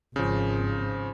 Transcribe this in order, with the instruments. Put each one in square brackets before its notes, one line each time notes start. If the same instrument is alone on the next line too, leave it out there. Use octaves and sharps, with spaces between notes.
[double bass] G#1 [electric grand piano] C#3 F3